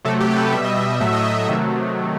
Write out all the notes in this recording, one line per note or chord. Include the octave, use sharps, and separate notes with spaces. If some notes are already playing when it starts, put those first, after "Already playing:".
C3 F#3 A3 A4
G4
A4
B4
B2 G3 E5
D#5
E5
A2 F#3 A3 E5
D#5
E5
C3 D#3 F#3 A3 E5